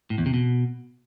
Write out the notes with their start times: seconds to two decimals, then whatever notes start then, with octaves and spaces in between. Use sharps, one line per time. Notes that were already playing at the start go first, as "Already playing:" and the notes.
0.10 A2
0.18 E2
0.26 C3
0.34 B2